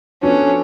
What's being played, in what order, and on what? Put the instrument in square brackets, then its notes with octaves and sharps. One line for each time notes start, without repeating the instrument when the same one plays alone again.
[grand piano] F3 B3 D4 F#4 A4 [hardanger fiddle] C#4